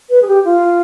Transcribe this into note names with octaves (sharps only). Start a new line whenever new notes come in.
B4
G#4
G4
F4